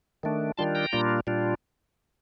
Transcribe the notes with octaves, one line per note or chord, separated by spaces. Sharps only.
D#3 A3 D4
D#3 G3 D4 F4 A5 C6
G5 A#5
A#2 G3 A#3 D4 F4
A#2 G3 D4 F4